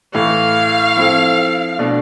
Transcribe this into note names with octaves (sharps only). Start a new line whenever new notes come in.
A2 E3 A3 F5
F3 C4 E4 A4
B2 A3 D4